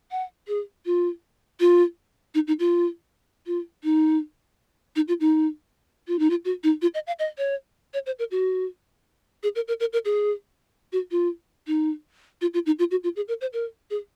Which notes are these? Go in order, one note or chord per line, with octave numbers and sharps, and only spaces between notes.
F#5
G#4
F4
F4
D#4
D#4
F4
F4
D#4
D#4
F4
D#4
F4
D#4
F4
F#4
D#4
F4
D#5
F5
D#5
C#5
C#5
C5
A#4
F#4
G#4
A#4
A#4
A#4
A#4
G#4
F#4
F4
D#4
F4
F4
D#4
F4
F#4
F4
G#4
A#4
C5
A#4
G#4